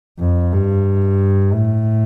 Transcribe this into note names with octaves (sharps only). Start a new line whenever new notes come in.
F2
G2
A2